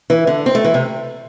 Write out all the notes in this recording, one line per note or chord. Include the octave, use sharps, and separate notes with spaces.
E3
D3
C4
A3
E3
C3